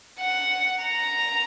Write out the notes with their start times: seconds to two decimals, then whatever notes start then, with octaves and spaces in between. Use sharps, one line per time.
0.20 F#5
0.84 A#5